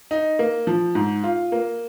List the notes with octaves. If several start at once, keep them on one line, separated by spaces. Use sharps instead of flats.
D#4
A#3
F3
G#2
F4
A#3